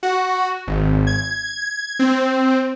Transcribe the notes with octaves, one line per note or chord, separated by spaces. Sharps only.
F#4
G#1
G#6
C4